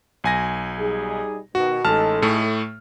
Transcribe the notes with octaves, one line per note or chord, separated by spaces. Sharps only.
B1 G#5 A#6
G3 D#4 G#4
B2 D#3 F#4
A1 G#3 D#4 A4 A5 F6
A2 A3